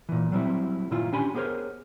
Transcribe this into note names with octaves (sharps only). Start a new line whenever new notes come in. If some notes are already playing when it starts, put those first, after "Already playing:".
A#2 E3
F#3 G3 C4 E4
A#2 D#3 E4 F4
C#4 D4 G4 G#5 B5 C6
B3 G4 G#4 A#4 C5 C#5